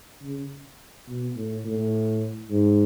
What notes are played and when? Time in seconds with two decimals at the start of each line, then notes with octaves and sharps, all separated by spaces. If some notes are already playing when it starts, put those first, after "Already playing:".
0.22 C#3
1.08 B2
1.36 A2
1.65 A2
2.50 G#2